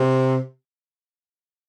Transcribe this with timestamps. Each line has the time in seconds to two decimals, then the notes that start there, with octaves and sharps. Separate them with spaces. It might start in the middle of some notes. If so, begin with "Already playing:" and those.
Already playing: C3